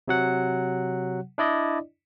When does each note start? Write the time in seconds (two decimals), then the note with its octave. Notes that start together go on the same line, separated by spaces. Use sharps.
0.08 C3 F#3 F#5
1.38 D4 E4 D5 D#5